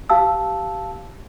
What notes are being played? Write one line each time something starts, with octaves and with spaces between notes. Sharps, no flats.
G4 F5 A5 E6